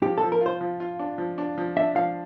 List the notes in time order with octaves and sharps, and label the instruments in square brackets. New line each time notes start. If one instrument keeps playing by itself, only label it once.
[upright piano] F3 [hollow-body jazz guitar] G4
[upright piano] F3 [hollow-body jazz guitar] A4
[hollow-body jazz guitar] A#4
[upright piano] F4 [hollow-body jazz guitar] C5
[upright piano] F3
F4
D4
F3
D4
F3
[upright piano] D4 [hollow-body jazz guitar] E5
[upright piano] F3 [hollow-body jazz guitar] F5